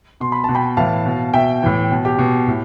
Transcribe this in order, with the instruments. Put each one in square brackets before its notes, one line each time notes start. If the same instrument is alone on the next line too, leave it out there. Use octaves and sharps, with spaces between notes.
[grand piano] B2 C6
B5
B2 A5
G5 B5
A2 E3 F5 A5
B2
B2 E5 G5
A2 E3
B2
G4
B2
A2